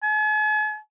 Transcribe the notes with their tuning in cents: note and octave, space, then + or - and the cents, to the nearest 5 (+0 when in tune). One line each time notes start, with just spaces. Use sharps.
G#5 +45